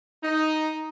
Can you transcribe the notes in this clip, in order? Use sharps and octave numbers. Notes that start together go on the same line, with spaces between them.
D#4